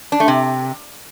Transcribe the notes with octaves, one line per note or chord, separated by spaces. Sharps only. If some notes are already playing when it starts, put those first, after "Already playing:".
D4
A3
C3